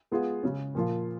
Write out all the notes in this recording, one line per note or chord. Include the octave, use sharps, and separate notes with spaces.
G#3 B3 F4 G#4
C#3 G#3 C#4
A#2 F3 A#3 F4